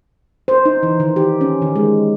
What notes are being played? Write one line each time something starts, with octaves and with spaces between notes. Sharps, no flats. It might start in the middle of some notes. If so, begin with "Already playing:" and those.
C5
D#4
E3
D#3
G4
C#4
D#3
G#3